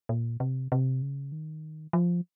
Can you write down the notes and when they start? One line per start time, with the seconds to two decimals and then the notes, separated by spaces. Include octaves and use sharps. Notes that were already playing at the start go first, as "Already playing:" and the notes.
0.09 A#2
0.40 C3
0.72 C3
1.02 C#3
1.32 D#3
1.93 F3